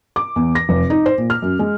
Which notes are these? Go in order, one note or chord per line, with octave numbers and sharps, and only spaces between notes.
D6
E2
A#6
F1
D#4
C5
A#2
F6
F#2
G#3